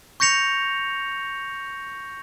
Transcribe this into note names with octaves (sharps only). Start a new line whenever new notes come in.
C#6 G6 A#6 C#7 F7